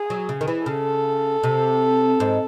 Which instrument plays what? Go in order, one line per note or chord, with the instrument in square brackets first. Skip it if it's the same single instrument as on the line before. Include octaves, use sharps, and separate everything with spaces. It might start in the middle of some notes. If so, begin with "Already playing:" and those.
Already playing: [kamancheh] G#4
[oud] F#3
C#3
D#3
E3
[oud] C#3 [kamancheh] A4
[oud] C3
G#2